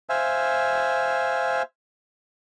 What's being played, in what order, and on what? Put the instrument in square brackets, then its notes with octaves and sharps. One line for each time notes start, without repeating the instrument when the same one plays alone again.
[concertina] C5 E5 F5 G#5